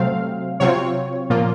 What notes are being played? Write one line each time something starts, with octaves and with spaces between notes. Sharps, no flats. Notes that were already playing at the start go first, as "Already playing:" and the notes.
Already playing: C3 F#3 A3 C4 F5
C3 F#3 C4 F4 C#5
A#2 F3 A#3 F4